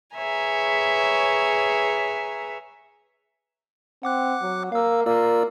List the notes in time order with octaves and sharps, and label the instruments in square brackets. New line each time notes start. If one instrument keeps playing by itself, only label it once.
[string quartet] G#4 B4 C#5 E5 G#5 A#5
[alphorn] C4 [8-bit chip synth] F#5 D6 F#6
[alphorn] F#3
[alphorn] A#3 [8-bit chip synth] F5 E6
[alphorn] A#3 [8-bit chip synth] F4 D5 E6